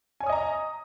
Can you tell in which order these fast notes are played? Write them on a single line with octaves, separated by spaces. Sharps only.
G#5 C#5 D#6 D#5 A#5